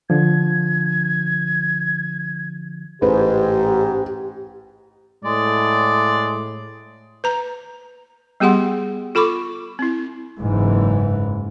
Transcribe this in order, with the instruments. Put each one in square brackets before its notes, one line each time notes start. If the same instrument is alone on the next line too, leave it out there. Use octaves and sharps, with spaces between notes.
[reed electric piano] D3 F3 [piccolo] G#6
[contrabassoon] A1 [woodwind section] G#2 [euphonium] G4 [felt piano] B4
[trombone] A2 [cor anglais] G#3 [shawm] D5
[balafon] B4 A#5
G3 B3 G4 G#4 F#5 C6
F4 A4 B5 C#6 D6
C4 E4
[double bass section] F#1 G#2 E3